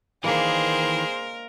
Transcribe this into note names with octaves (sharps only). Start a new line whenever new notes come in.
D#3 E3 G#3 A#3 D4 G#4 A#4 C5